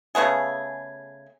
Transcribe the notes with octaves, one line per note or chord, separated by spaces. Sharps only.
C#3 A3 B3 G#4